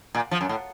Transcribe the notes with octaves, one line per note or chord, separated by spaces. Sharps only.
A#2
F3
F#2
A2